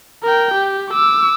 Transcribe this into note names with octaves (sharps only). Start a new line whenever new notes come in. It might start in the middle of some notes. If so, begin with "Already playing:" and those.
A#4 G5
G4
D6 E6